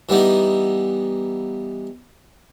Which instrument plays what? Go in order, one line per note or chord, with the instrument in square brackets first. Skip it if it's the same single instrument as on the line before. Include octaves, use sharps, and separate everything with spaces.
[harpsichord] E3 G3 B3 D#4